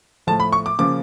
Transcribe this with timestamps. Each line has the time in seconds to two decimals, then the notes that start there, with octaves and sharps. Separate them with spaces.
0.27 A2 F3 A3 A5
0.40 B5
0.52 C#6
0.66 D6
0.79 C#3 F3 A#3 D6